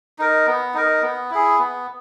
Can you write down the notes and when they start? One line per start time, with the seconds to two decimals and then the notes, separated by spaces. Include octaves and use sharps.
0.19 D#4 A#4
0.47 B3
0.74 D#4 A#4
1.02 B3
1.31 E4 G#4
1.59 B3